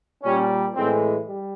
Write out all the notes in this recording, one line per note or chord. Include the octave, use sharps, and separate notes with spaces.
A#2 G3 C#4
A2 E3 G#3 C4
G3